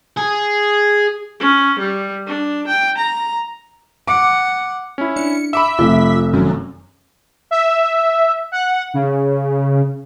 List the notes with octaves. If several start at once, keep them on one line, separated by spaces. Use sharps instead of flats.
G#4
C#4
G3
D4
G5
A#5
F#5 D6
C#4 E4
D4 C#7
E5 B5 D6 E6
F1 F4
F#2 D#3
E5
F#5
C#3